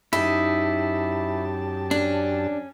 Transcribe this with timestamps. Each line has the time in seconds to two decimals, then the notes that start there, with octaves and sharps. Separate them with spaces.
0.13 F#2 D#4 E4 G4 A5
1.91 C#4 D4